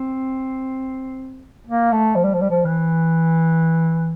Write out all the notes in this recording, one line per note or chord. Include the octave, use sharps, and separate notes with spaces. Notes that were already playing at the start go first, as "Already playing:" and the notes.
Already playing: C4
A#3
A3
F3
G3
F3
G3
F3
E3